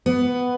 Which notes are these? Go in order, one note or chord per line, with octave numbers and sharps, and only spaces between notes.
B3